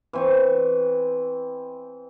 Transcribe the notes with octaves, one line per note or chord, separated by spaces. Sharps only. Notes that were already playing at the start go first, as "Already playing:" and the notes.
E3 C4 C#6